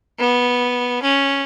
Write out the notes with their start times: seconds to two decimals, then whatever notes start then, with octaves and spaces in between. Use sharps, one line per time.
0.19 B3
1.02 C#4